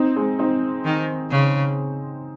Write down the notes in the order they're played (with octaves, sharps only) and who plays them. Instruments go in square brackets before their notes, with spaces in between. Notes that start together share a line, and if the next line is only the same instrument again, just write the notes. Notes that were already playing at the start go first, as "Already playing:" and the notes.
Already playing: [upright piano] C4 D#4
G#3 C4
C4 D#4
[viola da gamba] D#3
C#3